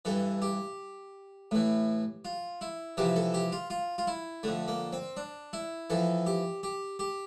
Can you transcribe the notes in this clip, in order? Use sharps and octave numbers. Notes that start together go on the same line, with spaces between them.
G2 E3 A4
G4
A2 E3
F4
E4
F2 C3 E3 G4
A4
G4
F4
F4
F4
E4
F2 D3 A3
A#3
C4
D4
E4
F2 E3 A4
G4
G4
G4